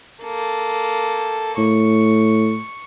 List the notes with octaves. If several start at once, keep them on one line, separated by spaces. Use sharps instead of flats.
A#3 A4
A2 C#6